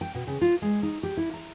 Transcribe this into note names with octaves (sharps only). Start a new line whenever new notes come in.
G5
B2
C#3
F4
G#3
D#4
G4
E4
A#5